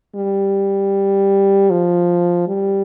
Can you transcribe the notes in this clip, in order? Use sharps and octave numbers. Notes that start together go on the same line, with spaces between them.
G3
F3
G3